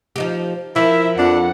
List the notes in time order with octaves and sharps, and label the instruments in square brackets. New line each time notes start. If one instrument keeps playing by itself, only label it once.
[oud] F3 D#4 G4
[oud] F3 [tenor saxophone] E4 [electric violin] A#4 E5
[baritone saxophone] F2 [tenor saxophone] D4 [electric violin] F#5